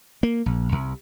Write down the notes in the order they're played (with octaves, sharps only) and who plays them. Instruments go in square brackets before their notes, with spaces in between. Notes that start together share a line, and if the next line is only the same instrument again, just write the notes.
[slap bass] A#3
A#1
C2